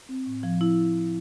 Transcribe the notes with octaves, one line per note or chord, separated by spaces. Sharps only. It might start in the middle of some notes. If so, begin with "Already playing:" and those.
C4
A2
F3
E4